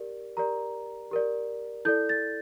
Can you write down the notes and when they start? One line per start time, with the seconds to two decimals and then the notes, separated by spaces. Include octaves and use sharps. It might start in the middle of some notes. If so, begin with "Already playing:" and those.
Already playing: G4 A#4 D5
0.37 G4 A#4 D5 A#5
1.11 G4 A#4 D5
1.85 E4 A4 D5 G6
2.09 A6